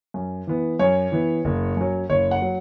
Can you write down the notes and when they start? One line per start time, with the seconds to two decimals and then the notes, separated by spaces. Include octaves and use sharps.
0.14 F#2
0.47 E3 B3
0.79 F#2 C#5
1.12 E3 B3
1.45 F#1
1.77 F#2 F#3
2.10 F#1 C#5
2.31 F#5
2.42 F#3